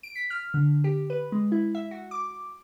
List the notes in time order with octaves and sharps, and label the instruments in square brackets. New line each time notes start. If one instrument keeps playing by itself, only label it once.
[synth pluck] D7
B6
F6
D3
G4
B4
G#3
E4
E5
F#4
D6